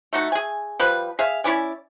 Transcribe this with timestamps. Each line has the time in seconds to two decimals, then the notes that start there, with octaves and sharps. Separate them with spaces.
0.13 A3 D#4 F#4
0.32 G#4 G#5
0.80 F3 G3 B4
1.19 G#4 E5 F5
1.44 C#4 E4 D5 G#5